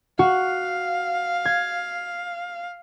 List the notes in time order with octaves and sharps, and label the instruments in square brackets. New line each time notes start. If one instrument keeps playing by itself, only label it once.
[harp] F#4 [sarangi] F5
[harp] G#6